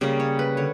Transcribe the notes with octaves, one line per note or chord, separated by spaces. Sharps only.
C#3 G3 A#3 D5
C#5
B4
D3 C#5